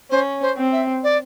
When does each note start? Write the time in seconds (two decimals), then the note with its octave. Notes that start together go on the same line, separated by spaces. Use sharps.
0.11 C#4 C5
0.42 C5
0.57 C4
0.72 E5
1.03 D5